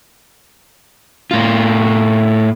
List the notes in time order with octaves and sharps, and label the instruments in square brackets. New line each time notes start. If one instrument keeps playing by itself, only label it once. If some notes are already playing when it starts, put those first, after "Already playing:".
[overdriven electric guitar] A2 F4